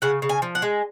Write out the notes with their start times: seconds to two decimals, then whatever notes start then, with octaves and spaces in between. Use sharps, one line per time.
0.02 C#3 F#5
0.22 C#3
0.29 G#5
0.42 F3
0.55 F#5
0.62 G#3